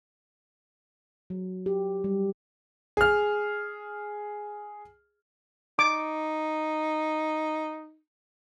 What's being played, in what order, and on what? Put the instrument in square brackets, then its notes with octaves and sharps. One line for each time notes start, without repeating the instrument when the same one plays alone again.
[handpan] F#3
G4
G3
[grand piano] G#4 F6
[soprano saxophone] D#4 [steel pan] D6